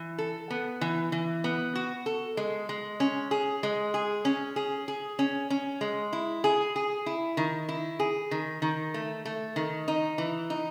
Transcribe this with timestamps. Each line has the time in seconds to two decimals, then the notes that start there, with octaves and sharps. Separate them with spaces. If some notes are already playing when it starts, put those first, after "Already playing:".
Already playing: E3
0.18 A4
0.50 B3
0.81 E3
1.12 E3
1.44 B3
1.75 F#4
2.06 A4
2.37 G#3
2.69 G#3
3.00 C#4
3.31 G#4
3.63 G#3
3.94 G#4
4.25 C#4
4.56 G#4
4.88 G#4
5.19 C#4
5.50 C#4
5.81 G#3
6.13 E4
6.44 G#4
6.76 G#4
7.06 E4
7.37 D#3
7.69 E4
7.99 G#4
8.31 D#3
8.62 D#3
8.94 A3
9.25 A3
9.56 D#3
9.88 D#4
10.18 E3
10.50 D#4